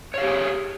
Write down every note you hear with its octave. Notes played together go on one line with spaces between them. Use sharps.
G4 G#4 C#5 F5